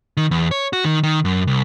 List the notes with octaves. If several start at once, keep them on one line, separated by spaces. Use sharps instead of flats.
D#3
E2
C#5
F#4
D#3
D#3
F#2
C2